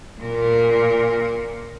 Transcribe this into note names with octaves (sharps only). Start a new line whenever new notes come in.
A#2 A#4